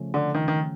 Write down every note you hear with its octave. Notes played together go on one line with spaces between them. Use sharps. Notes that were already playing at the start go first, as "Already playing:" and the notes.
Already playing: C#3 F3 A3 C#4
D3
D#3
D#3